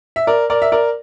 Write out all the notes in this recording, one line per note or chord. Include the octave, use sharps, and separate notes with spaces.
E5
A#4 D5
A#4 D5
E5
A#4 D5